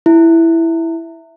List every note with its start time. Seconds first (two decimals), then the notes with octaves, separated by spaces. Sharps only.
0.06 E4